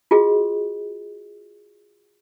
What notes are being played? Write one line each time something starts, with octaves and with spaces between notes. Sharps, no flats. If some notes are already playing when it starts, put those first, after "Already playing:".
F4 F#4 G#4 D#5